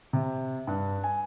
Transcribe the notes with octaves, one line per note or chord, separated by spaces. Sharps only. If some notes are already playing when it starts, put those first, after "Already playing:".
C3
G2
G#5